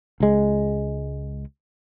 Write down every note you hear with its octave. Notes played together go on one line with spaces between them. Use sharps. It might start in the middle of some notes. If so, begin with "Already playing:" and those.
C#2 G#3